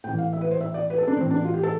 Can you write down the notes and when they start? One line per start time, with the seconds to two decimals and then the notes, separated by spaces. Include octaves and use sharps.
0.04 A2 G5
0.09 E3
0.18 F5
0.33 E5
0.41 B4
0.51 C5
0.61 E5
0.74 D5
0.90 B4
0.98 A4
1.08 D4
1.17 A2 E3 C4
1.31 D4
1.44 F4
1.54 G4
1.63 A4